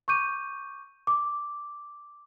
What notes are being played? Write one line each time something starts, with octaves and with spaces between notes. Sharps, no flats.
C#6 D6 G6 D#7
D6